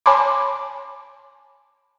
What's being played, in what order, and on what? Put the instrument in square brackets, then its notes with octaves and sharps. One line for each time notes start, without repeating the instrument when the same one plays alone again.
[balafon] C#5 G#5 A5 B5 C6 D6